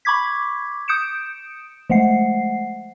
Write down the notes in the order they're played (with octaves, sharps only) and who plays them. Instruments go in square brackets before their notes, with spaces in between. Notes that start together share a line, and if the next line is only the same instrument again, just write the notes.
[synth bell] B5 C#6 D6 G#6 B6
D#6 G6 C#7 D7 E7
F3 G#3 A3 F#5 C7